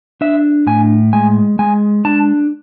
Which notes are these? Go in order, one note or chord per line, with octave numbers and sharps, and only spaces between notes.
D4 E5
A2 G#5
G#3 G#5
G#3 G#5
D4 A5